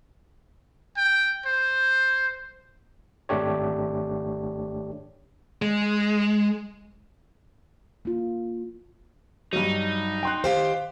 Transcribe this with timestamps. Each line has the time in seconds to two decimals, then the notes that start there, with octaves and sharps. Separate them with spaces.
0.97 G5
1.46 C5
3.29 G#1 A3 D4 G4 C#5
5.62 G#3
8.05 A#3 F4
9.53 G2 F#3 D#4
10.23 G5 C6 F#6
10.44 D#3 G4 C5 F5